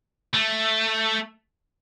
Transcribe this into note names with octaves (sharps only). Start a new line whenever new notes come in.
A3